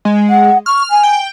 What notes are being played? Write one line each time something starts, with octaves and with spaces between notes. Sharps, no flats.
G#3
F#5
C#6 F6
G#5
G5